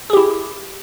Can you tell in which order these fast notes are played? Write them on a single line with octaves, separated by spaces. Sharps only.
G#4 G4 E4